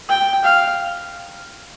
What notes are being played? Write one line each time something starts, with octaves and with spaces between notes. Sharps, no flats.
G5
F5